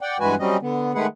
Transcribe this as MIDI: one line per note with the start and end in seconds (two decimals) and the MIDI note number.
0.01 0.17 74
0.01 0.17 78
0.01 0.17 79
0.20 0.35 43
0.20 0.35 52
0.20 0.35 56
0.20 0.35 66
0.20 0.35 71
0.20 0.35 80
0.39 0.57 54
0.39 0.57 55
0.39 0.57 60
0.39 0.57 61
0.39 0.57 75
0.62 0.92 50
0.62 0.92 59
0.95 1.06 51
0.95 1.06 56
0.95 1.06 57
0.95 1.06 68
0.95 1.06 71
0.95 1.06 78